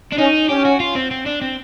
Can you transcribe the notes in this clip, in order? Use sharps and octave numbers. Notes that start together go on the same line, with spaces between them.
D4
C#4 D#4
C#4 G4
F#4
F4
C4
C4
D4
C4